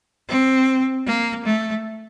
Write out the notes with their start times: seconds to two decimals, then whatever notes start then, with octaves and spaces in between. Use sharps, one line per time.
0.28 C4
1.06 A#3
1.45 A3